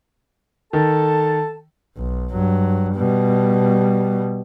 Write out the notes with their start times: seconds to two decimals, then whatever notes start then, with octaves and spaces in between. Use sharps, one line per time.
0.73 D#3 A4 A5
1.97 B1
2.32 G2 F#3
2.96 B2 G3